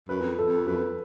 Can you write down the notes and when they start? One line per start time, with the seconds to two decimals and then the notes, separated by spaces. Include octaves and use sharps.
0.09 F#2 B4
0.21 F2
0.39 A4
0.46 F2
0.67 F#2 B4
0.75 F2